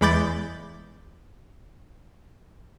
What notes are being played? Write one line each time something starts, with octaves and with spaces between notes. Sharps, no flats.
E2 G#3 B5 D6 G6 A6